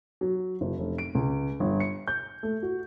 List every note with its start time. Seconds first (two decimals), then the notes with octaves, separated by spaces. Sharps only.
0.21 F#3
0.61 F#1
0.78 F1
0.98 D7
1.15 C#2
1.60 G1
1.80 C#7
2.08 G6
2.43 A3
2.63 F#4